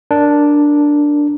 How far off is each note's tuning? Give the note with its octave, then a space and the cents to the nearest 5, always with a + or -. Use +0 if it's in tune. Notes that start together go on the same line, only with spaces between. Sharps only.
D4 +0 A#4 +0